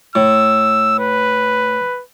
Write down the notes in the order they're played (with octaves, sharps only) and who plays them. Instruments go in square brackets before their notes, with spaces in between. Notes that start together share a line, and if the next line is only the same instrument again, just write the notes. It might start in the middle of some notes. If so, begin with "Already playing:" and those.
[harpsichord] A2 [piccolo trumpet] E6
[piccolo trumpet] B4